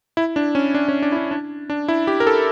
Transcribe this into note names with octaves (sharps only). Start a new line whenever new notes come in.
E4
D4
C#4
D4
C#4
D4
E4
D4
D4
D4
E4
G4
A#4
A4